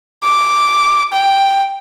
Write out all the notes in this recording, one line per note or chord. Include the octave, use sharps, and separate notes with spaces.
D6
G5